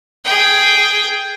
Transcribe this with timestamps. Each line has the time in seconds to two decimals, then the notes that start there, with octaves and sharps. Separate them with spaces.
0.25 G#4 G5